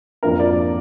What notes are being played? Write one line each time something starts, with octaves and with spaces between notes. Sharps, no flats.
F2 F3 A#3 D4 A#4
D5